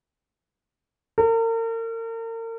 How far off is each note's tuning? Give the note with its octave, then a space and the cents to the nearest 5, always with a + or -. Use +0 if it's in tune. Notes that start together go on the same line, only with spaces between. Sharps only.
A#4 -40